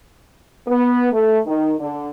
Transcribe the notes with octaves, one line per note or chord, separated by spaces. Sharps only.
B3
A3
D#3
D3